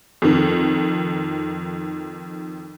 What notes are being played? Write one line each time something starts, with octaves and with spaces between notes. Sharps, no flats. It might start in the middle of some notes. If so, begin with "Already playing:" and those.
F2 D#3